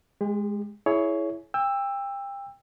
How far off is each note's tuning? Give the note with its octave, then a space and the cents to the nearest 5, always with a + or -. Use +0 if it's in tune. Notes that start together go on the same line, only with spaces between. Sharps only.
G#3 +0 G4 +45
E4 +0 G#4 +25 C#5 +15
G5 +30 E6 +5